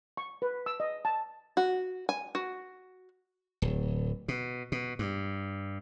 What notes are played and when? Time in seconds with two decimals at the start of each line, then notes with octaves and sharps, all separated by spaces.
0.17 C#6
0.42 B4
0.66 E6
0.80 D#5
1.05 A5
1.57 F#4
2.09 G#5
2.35 F#4
3.62 D1
4.28 B2
4.72 B2
4.99 G2